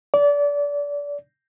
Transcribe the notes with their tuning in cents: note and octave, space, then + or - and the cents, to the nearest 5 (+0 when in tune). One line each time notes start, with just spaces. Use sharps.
D5 -25